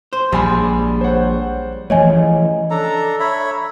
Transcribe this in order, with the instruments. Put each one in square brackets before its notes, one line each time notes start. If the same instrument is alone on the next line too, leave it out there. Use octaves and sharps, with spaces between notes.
[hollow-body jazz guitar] C5
[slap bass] A#1 [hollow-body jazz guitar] G3 G#3 [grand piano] G#5 B5 C6
[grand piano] C5 C#5 F#5
[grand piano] C#3 [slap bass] E3 F3 A3 [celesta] C#5 D#5 G#5
[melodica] D4 A4 A#5
C#5 E5 B5